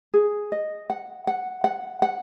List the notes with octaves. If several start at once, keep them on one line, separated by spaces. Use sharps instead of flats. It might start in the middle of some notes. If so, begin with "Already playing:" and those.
G#4
D#5
F#5
F#5
F#5
F#5